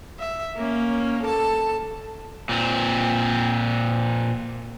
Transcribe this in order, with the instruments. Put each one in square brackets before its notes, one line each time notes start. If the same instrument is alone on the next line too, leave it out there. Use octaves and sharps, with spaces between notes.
[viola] E5
A#3 C#4
A4 A5
[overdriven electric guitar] A#2 C4